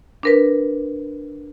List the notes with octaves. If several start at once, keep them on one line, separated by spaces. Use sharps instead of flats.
D4 A#4 B4